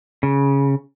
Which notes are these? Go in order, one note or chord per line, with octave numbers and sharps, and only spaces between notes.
C#3